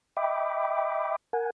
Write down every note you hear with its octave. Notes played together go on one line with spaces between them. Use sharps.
D#5 E5 G5 B5 D6
A#4 F#5 G#5